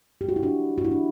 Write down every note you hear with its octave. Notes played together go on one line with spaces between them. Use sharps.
G4
F#4
E4
D4 F#4
F#4
E4
D4